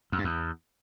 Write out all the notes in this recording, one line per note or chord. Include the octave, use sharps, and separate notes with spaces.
F2
G2
E2